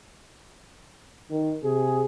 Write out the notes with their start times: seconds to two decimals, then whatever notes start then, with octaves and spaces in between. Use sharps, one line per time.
1.30 D#3
1.62 C3 G#4